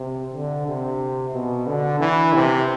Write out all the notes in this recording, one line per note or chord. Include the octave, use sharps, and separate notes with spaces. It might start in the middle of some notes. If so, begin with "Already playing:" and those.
Already playing: C3
D3
C3
B2
D3
E3
C3